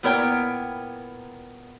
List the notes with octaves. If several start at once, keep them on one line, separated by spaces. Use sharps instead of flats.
A#2 B3 E4 A#4 C#5 G5